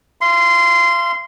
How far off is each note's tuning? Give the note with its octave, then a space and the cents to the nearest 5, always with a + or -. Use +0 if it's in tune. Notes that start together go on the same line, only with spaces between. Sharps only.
F5 -40 C6 -15